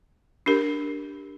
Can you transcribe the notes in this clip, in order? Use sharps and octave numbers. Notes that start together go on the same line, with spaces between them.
D4 G4 A#4